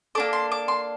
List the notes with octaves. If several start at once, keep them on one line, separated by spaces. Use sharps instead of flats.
A#3 D4 A4 D6
C6
D6
C6